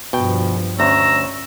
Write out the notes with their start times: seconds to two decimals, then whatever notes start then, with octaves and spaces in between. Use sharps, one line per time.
0.13 G2 B2 F3 G5
0.80 D2 C#4 A#5 E6